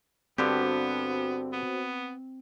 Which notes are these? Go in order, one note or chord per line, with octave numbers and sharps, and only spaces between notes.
G2 D3 B3 C4 F#4 G4 C5
B3